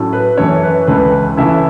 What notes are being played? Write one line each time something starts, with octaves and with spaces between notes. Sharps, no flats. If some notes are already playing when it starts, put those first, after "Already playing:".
Already playing: A2 F#3 A3 C#4
B4
F#2 E3 A3 C#4 C#5
B4
C#2 C#3 E3 A3 C#4 B4
C#3 E3 A3 C#4 E4 E5